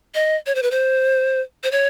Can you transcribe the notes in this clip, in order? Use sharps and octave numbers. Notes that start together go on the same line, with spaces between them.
D#5
C#5
C5
B4
C5
C5
C#5